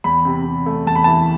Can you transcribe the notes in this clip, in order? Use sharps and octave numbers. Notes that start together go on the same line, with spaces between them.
E2 B5
C3
C3
A3
E2 A5
B5
E3 A5